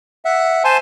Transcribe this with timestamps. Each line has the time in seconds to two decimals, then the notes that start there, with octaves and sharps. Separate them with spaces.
0.25 E5 F#5
0.64 C5 G#5 A5 C6